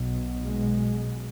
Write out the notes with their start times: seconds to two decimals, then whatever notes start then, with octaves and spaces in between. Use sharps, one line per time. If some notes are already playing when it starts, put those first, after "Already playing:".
Already playing: B1 B2
0.48 G#3